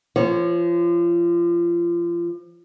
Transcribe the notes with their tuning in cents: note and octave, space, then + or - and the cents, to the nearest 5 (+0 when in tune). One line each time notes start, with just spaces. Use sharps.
F3 -30 C#5 -10